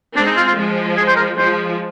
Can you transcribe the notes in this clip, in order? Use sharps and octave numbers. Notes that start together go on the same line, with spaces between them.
G#3 C4 D4
D#4
F4
F4
F3 G#3
G#4
C5
A#4
F3 G#3 C5